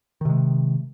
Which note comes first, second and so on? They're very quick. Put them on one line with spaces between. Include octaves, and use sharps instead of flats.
D#3 C3 G#3